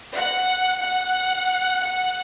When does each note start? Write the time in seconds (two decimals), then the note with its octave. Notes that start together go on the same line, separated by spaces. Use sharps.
0.15 F#5
0.82 F#5
1.82 F#5